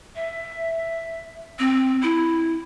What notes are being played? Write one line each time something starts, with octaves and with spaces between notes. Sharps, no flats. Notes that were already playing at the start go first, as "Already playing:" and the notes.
E5
C4
E4